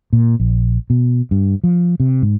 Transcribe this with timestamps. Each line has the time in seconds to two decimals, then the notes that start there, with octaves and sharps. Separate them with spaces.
0.13 A#2
0.40 A#1
0.90 B2
1.31 G2
1.64 F3
2.00 C3
2.22 G#2